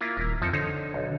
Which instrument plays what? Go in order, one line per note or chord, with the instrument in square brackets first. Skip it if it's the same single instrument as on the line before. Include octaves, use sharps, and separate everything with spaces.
[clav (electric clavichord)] A#3 E4 F4
[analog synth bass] D#1 [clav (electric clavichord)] E4 A#4
[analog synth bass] F2 [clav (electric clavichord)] F3 D#4 A4
[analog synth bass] D3 [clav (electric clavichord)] D#4 C5 C#5
[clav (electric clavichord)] B1